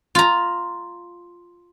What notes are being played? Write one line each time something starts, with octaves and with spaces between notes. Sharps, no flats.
F4 A#5